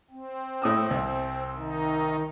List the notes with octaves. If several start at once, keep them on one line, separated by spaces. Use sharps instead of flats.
C4
A2 D#6 E6
C2
D#3 D#4